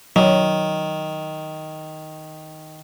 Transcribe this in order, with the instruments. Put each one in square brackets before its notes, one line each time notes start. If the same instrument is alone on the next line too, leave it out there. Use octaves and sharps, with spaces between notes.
[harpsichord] D#3 [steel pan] F#3